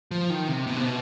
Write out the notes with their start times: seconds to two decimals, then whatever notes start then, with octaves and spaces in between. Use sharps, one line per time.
0.11 F3
0.30 D#3
0.48 C3
0.67 B2
0.76 C3
0.85 B2